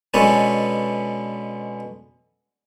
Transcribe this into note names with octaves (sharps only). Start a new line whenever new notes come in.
B2 G#3 C#4 D4 A4 B4